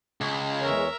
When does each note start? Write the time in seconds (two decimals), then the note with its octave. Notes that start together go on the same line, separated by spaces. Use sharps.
0.21 C#2 G#3
0.62 E2 E3 A#4 C#5 E5